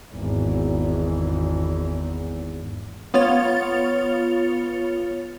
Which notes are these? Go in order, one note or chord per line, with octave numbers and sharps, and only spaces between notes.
G#1 E2
B3 F4 C#5 A6 F7